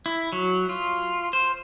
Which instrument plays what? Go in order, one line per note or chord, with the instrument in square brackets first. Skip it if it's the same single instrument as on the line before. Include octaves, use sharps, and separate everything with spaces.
[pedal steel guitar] E4
F#3
F4
C5